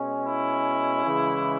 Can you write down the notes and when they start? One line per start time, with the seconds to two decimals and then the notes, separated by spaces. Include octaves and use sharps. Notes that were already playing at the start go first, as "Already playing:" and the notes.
Already playing: B2 G#3 C#4
0.24 E4
1.06 C#3 E3 G#3